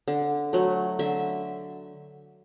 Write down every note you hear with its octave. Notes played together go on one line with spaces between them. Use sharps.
D3
F#3 A3
D3 E5